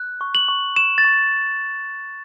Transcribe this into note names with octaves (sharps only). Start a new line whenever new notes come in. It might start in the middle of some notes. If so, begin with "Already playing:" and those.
Already playing: F#6
C#6
F#7
C#6
C#6 E7
A6
C#6